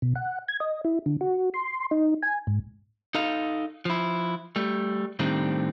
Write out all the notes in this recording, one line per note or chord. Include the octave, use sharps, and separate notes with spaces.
B2
F#5
G#6
D#5
E4
D3
F#4
C6
D#4
G#5
G#2
D#4 A4 D#5 F5
F3 E4
G3 A3
A2 D#3 G3 A3 C4 D4